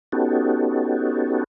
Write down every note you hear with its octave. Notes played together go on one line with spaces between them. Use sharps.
B3 C#4 D#4 F#4 G4 A4